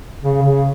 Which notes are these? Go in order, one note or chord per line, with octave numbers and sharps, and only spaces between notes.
C#3
C#3